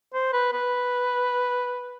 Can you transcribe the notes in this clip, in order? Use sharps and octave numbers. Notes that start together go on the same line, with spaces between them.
C5
B4
B4